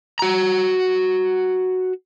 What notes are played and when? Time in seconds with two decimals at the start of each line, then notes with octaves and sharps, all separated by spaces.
0.19 F#4 A#5